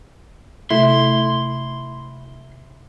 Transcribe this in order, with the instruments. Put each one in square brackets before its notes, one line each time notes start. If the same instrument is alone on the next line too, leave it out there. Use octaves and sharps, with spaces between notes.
[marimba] C3 A3 A4 [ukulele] E4 [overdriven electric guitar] C6